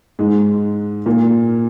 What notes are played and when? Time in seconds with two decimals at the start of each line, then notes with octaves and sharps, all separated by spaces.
0.19 G#2 G#3
1.06 A#2 A#3